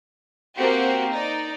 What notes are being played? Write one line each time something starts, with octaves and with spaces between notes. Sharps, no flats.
A#3 C4 F#4 G4
D#4 D5